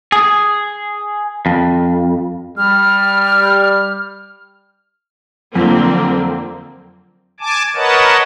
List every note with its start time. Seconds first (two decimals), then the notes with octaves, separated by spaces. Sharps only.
0.12 G#4
1.46 F2
2.57 G3 F6
5.55 F2 D3 F#3 A#3 C4 A#5
7.40 G#5 A5 D6
7.75 A#4 B4 C#5 D#5 F#5 A5